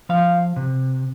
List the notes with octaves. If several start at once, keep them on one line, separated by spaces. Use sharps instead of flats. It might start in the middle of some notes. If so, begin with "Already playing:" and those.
F3 F5
C3